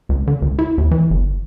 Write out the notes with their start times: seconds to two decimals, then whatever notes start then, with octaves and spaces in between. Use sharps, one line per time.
0.09 C#2
0.27 D3
0.42 C#2
0.59 E4
0.78 D#2
0.91 E3
1.10 G1